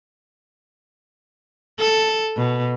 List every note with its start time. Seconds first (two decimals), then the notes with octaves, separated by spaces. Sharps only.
1.80 A4
2.37 B2